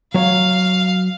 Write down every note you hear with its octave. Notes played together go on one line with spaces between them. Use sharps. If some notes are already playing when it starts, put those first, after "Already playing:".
F#3 C#5 F5